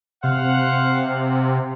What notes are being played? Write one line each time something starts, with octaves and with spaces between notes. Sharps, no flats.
C3 C5 F5 F#5